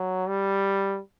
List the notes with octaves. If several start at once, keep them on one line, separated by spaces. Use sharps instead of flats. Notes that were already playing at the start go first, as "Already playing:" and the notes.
Already playing: F#3
G3